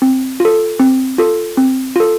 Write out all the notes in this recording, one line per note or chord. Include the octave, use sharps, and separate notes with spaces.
C4
F4 A4
C4
F4 A4
C4
F4 A4